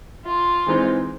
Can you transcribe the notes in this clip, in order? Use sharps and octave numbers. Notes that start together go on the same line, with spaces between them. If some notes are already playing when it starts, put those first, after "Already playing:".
F4
E3 G#3 C4 D#4